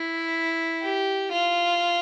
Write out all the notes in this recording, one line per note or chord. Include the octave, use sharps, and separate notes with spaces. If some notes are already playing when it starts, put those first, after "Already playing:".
Already playing: E4
G4
F4